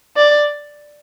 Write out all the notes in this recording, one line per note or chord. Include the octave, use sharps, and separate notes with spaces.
D5